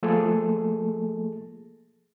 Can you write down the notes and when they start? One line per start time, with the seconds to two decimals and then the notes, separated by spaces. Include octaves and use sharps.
0.03 F3 A3 A#3 G#4 A4